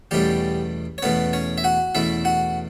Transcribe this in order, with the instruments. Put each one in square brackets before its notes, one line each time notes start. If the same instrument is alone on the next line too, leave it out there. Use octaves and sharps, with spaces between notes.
[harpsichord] E2 B2 G3 A3 C#4 G4
C#5
E2 B2 A3 B3 C#4 B4
C#4 C#5
E5
F#4 F#5
E2 B2 A3 C#4 E4 E5
F#4 F#5